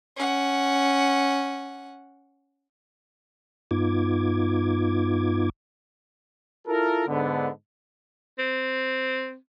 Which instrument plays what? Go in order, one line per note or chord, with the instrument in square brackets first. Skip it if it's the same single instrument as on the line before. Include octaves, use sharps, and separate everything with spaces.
[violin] C#4 F#5
[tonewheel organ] G2 B3 D#4 F4 D6 G#6
[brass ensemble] E4 F4 A4 A#4
G#2 D3 B3
[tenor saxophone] C4